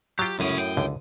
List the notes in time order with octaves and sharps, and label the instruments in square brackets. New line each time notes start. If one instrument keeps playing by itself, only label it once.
[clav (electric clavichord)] F#3 F4 [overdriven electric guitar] G4
[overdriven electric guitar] C#2 C#4 [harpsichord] F#2 A2 D#6
[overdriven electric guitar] G5
[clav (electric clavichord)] C#2 D3